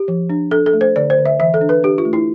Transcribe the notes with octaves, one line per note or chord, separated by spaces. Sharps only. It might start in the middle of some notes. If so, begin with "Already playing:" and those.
Already playing: G4
F3
D4
D4 A4
A4
A3
C5
D3 D5
C5
D3
E5
E3 E5
A4
D4
B4
D4 G4
F4
A3
E4